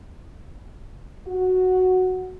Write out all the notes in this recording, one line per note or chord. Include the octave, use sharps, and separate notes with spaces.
F#4